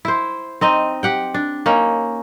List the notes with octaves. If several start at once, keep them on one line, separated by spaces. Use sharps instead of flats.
E4 C5
C4 D#4 D#5
G4 F#5 G5
D4
A#3 C#4 D#4